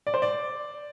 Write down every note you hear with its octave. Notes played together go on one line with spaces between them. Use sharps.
D5
C5
D5